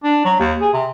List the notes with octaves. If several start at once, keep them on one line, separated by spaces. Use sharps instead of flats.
D4
F#3
D#2
G#4
C3